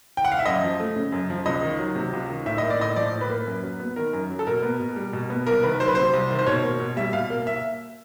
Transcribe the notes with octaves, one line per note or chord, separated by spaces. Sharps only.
G5
F#5
F5
E5
F#2 D#5
F3
A3
C#3
F#2
F3
C#2 D#5
D#3
F#3
C3
C#2
D#3
A2 E5
A#3 D#5
D5
A2 D#5
F3 D5
A2
B4
A#3
F#2
F#3
B3
D#3 A#4
F#2
F#3
A4
B2 A#4
B3
B2
G3
B2
B3
C2 A#4
D#3 B4
F#3 C5
B4
C3 C5
C2
D#3
C5
B2 C#5
A#3
B2
G3 E5
B2 F5
A#3
E5